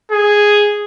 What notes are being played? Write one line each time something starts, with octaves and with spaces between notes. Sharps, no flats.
G#4